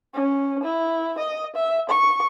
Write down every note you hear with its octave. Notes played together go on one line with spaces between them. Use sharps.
C#4
E4
D#5
E5
C#6